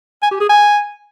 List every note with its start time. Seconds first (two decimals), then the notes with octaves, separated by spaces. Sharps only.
0.22 G#5
0.31 G4
0.40 G#4
0.49 G#5